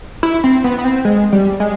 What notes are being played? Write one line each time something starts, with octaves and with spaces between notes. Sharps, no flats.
E4
C4
B3
B3
C4
G#3
G3
G#3